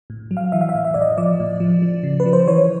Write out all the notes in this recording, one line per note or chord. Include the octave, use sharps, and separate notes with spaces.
A2
F#3
F5
E3 E5
F5
E5
A2
E5
A2 D5
D#5
F3 D5
A2
F3
F3
C#3
B4
F3
C5
E3 C#5